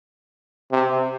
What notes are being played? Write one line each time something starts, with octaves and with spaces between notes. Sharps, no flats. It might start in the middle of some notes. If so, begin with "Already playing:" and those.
C3